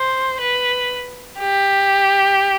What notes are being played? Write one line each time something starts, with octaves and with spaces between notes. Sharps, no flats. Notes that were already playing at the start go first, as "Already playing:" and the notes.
Already playing: C5
B4
G4